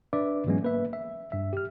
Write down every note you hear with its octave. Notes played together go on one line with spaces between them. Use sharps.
D4 B4 D5 E5 D6
G#2 E3 F#3 G#3 B3 C#4
A#3 B4 E5
E5
G2 E5
G4 F6